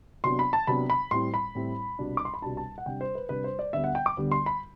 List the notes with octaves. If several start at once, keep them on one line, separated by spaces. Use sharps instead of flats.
C3 F#3 B3 D4 C6
B5
A5
C3 F#3 B3 D4 B5
B5
A2 G3 C4 E4 C6
B5
A2 G3 C4 E4
C2 B2 G3 D4
D6
C6
B5
C2 B2 G3 D4 A5
A5
F#5
C3 G3 D4 G5
C5
B4
C3 G3 D4 B4
C5
D5
D2 D3 G3 B3 E5
F#5
G5
D6
D2 D3 G3 B3
C6
B5